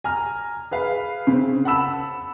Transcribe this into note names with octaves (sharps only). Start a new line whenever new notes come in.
G#5 A#5 F6
G#4 B4 F5
C#3 C4
F#5 A5 B5 E6 E7